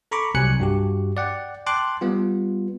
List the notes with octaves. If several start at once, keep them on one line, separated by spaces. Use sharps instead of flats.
A4 A#5 B5 C#6 D6
C2 C3 F#3 G#5 F#6 C#7
G2 F#4 G4
D5 F#5 G5
G5 A5 C6 D6 F#6
G3 B3 F4